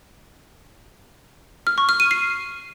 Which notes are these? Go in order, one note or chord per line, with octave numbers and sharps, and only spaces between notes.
F6
C#6
F6
D#7
C7